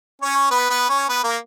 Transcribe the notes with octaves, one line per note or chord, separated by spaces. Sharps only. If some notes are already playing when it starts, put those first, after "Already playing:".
C#4 C#5
B3 B4
B3 B4
C#4 C#5
B3 B4
A#3 A#4